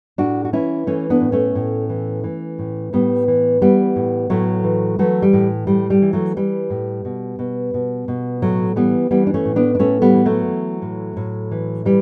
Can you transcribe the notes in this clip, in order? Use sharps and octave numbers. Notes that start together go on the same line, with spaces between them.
A2 D4 F#4
F#4
E3 C#4 E4
E3 A3 C#4
B3 D4
A2
A3 C#4
A2
E3
E3
A2
A2 G3 B3
E3
E3 G3 B3
A2
A2 F#3 A3
E3
E3 F#3 A3
G3
A2
A2 G3
G3
E3
F#3 A3
E3 G3
A2
B2
B2
B2
B2
A2 F#3 A3
E3 G3 B3
E3 G3 B3
D4
A3 C#4
A2
B3 D4
D4
A2 A3 C#4
G3 B3
E3
F#3 A3
E3
A2
A2
E3
E3 G3